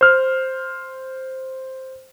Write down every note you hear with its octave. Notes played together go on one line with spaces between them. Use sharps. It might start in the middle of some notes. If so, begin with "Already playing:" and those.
C5 F6